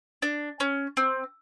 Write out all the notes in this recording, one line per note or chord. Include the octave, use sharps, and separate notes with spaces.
D4
C#4
C4